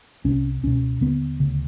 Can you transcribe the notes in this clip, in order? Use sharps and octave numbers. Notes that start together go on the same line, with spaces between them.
C2 C3 C#4
C#2 B2 C#4
D#2 D3 B3
D2 C#3